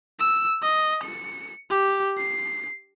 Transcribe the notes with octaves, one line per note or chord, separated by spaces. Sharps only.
E6
D#5
C#7
G4
C7